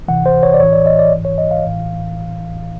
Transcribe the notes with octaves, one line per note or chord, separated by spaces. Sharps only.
D2 C3 E3 F#5
C5
C#5
D5
A#1 A2 E3 C#5
D5
D#5
D5
A#1 G#2 E3
C#5
D#5
F5
A1 A2 E3